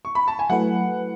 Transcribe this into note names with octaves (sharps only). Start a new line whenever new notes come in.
C#6
B5
A5
G#5
F#3 A3 E4 B4 F#5